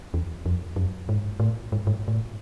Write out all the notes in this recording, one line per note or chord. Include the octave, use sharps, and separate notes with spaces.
E2
F2
F#2
G#2
A2
G#2
G#2
A2